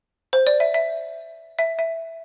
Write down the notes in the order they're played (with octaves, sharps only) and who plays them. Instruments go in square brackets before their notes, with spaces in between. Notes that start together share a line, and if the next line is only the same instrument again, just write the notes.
[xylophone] C5
D5
E5
E5
E5
E5